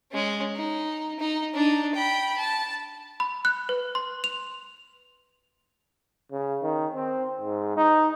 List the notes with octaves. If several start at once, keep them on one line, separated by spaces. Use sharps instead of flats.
G#3 C#4
D#4
D#4
D4 D#4
G5 B5
A5
B5
F#6
B4
C6
F7
C#3
D#3
C4
G#2
D#4